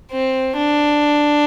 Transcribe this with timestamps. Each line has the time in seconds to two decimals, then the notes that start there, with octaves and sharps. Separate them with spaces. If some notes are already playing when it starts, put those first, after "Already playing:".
0.12 C4
0.58 D4